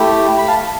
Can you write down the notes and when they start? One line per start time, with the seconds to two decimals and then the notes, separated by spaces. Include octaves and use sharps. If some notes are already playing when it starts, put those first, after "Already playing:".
Already playing: A3 E4 G4
0.38 B5
0.48 F5 A5